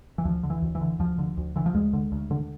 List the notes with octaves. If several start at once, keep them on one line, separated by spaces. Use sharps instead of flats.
E3
D2 F3
D3
E3
D2
E3
D3
D2 F3
D3
D2
D3 E3
F3
D2 G#3
D3
D2
D3